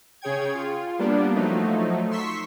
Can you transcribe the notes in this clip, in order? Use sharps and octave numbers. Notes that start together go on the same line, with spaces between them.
C#3 G#4 C#5 G5 G#6
F4
G3 A#3 B3 D4
F3 F#3 A3 D#4
C6 C#6 E6 B6